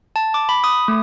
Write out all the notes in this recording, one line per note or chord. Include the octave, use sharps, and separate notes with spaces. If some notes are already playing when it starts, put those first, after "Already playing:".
A5
D6
B5
D#6
A3